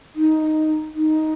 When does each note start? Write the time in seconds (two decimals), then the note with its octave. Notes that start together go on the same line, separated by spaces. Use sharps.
0.16 D#4
0.95 D#4